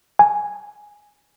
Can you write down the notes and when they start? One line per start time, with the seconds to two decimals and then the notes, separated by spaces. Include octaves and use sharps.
0.19 G#5